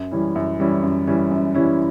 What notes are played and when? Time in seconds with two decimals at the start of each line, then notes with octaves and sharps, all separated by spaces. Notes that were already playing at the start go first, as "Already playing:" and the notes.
Already playing: F#2
0.11 E3 G3 C#4 E4
0.35 F#2
0.59 E3 G3 C#4 E4
0.83 F#2
1.07 E3 G3 C#4 E4
1.31 F#2
1.54 E3 G3 C#4 E4